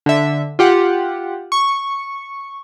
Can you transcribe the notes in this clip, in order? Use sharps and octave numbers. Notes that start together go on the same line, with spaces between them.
D3 E5
F4 G4 F#5
C#6